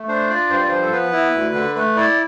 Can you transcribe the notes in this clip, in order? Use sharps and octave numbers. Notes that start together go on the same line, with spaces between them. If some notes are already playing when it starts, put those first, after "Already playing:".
Already playing: A3
D4 C5
F4 D5
G2 C5
D5
F3 C5
A4
B3 B4
E4
D2
D3
A3 B4
E4 D5